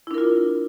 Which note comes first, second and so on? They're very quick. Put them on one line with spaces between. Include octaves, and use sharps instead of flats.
E4 D4 A#4 F4